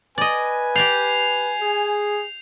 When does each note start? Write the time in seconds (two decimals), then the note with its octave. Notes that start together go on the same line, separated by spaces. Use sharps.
0.18 B4 D5 D#5 G#5
0.75 G4 D5 G5 G6 C7 F7
1.61 G#4